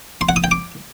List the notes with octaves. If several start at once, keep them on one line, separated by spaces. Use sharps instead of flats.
C6
F#5
D#6
G5
D6